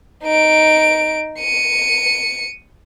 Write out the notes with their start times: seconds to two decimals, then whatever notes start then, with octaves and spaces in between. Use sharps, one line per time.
0.24 D#4 D7
1.39 C#7 D#7